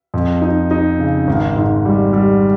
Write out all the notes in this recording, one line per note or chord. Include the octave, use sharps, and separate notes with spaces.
F2
D#4
D#4
C#3
G#1
G#2
G3
G3